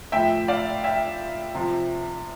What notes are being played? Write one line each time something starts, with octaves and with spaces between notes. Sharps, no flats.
A2 F3 E5 G5
D5 F5
E5 G5
C3 F3